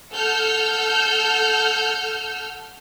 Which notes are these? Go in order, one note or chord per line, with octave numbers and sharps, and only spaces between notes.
A4 F#5 E6 F6 G6